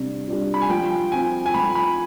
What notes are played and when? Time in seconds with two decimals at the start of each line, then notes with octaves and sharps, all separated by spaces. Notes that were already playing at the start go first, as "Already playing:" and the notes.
Already playing: C3 G3 D4
0.28 G3 D4 F4
0.54 B5
0.62 G#5
0.70 F3 G5
1.12 C4 F4 G#5
1.46 G#5
1.54 F3 B5
1.75 B5